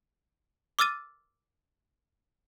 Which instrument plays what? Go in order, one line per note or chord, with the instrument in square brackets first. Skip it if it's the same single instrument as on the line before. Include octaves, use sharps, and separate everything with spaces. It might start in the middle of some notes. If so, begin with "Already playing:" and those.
[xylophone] D6 E6 F6 A6 D#7